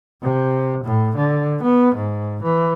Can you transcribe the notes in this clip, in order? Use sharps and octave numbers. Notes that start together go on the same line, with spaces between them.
C3
A2
D3
B3
G#2
E3